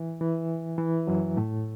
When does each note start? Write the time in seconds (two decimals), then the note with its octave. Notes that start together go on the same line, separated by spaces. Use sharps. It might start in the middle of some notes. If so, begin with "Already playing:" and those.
Already playing: E3
0.21 E3
0.78 E3
1.07 F#2 F#3
1.37 A2 A3